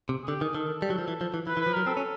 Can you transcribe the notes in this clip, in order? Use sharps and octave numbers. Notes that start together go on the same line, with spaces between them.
C3
G#4
D3 G4
D#3 G#4
D#3 A4
A4
G3
F#3
F3
E3
F3
E3
E3 B4
E3
B4
F3
F#3 A#4
C4 A4
C#4